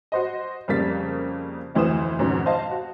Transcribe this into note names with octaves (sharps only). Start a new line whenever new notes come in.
F#4 C5 D#5
F2 C#3 G3 A#3 A6 B6
F1 D2 E3 C5 D#6 E7
F2 G#2 B2 D#3 C#4
C5 D#5 F5 A5
F#4